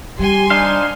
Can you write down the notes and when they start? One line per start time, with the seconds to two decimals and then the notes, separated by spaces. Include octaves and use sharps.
0.19 G3 G4 G#5 C6
0.50 D4 D#4 C5 F5